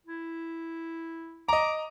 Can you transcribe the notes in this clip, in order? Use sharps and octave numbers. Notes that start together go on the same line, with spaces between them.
E4
D#5 A#5 D6